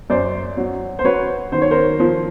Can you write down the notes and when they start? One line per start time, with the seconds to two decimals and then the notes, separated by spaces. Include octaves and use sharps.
0.10 F#2 C5 D5
0.57 F#3
0.99 C5
1.04 F#3 B4 C#5
1.52 D#3 C5
1.61 C#5
1.71 A#4 C5
2.00 F3